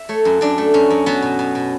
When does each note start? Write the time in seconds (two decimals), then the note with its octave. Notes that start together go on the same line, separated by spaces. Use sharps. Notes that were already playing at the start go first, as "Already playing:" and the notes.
Already playing: E5
0.09 A3 C#5
0.25 F#2
0.41 F#2 D4
0.58 A3
0.74 F#2 C#4
0.90 F#2
1.06 F#3 B3
1.22 B2
1.39 B2
1.55 B2